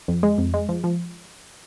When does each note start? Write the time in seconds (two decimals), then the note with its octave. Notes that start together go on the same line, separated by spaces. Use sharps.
0.08 F2
0.23 G#3
0.38 F2
0.54 G#3
0.69 F3
0.84 F3